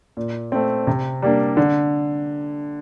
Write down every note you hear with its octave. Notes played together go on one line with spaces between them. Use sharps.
A#2
A3 C4
C3
G3 A#3 D4
D3